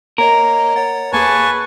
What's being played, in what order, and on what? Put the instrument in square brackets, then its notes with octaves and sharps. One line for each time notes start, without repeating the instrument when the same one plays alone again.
[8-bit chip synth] A#3 C#5 D#5 [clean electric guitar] A#4
[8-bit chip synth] C#5 F#5 A6
[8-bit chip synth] D#2 A#3 G#4 [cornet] B4 [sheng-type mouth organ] G#5 A5 C#6